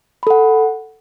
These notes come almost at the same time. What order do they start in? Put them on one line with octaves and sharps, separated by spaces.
B5 A4 F#5